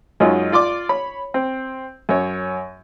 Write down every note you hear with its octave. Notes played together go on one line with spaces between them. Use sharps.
F#2 G#3 C#4 D#4 F4 F#4
F4 D5 C6 D6
C#5 B5
C4
F#2 C#5